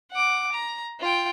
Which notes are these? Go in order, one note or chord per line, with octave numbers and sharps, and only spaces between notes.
F#5 D6
A#5
F4 G5